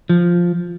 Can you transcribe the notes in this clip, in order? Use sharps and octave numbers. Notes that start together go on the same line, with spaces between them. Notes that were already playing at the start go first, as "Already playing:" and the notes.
F3